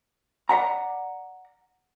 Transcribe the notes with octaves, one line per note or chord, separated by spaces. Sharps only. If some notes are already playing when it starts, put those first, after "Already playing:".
D5 E5 F#5 A#5